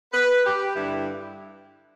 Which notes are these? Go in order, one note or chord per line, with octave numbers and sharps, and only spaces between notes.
B4
G4
G2 D3 G3 E4